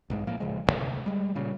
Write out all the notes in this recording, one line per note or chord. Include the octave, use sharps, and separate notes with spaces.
B1 G#2 G#3
A2 F3 A#3
D#1 C#3 F3 G#3
A1 D2 C3
G3 G#3
A#2 C#3 G3